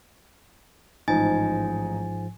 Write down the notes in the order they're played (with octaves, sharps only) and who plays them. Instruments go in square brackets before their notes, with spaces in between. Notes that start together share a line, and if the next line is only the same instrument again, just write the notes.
[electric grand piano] A1 D#4 [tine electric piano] G#2 F3 A6 [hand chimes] G#5